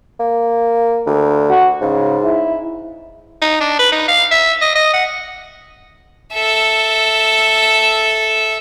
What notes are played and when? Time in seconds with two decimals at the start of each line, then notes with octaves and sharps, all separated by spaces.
0.20 A#3
1.06 D2
1.49 F#4
1.81 G#2 C#3
2.23 E4
3.42 D#4
3.61 D4
3.79 B4
3.92 D#4
4.08 F5
4.31 E5
4.62 D#5
4.76 D#5
4.93 F#5
6.33 A4 E5